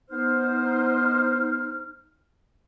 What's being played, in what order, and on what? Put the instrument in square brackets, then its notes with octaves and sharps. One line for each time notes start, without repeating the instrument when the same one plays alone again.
[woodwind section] B3 C5 [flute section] D#4 F6